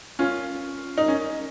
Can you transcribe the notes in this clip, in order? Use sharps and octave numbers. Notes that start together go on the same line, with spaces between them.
C#4 F4
D#4
C#4